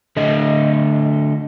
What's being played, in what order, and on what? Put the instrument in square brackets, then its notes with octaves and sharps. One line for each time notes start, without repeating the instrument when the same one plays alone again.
[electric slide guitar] D3 A3 D#5